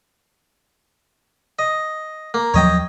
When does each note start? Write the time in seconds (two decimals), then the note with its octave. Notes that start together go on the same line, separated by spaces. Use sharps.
1.59 D#5
2.34 A#3
2.54 D#2 F3 F#3 C#5 D#5 G5